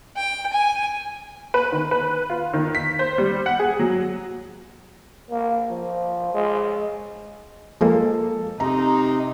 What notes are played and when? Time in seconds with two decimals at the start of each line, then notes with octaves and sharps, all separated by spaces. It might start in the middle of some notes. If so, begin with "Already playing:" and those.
0.16 G5
0.53 G#5
1.54 B4
1.72 D#3
1.91 B4
2.30 F4
2.54 D#3
2.75 B6
2.99 C5
3.18 G3
3.46 F#5
3.59 G#4
3.80 F#3
5.31 A#3
5.70 F3
6.34 G#3
7.81 F3 G#3 A#3 A4
8.60 C3 D#4 A#5